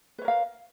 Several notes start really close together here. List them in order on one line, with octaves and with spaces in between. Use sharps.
B4 C#5 A#4 F5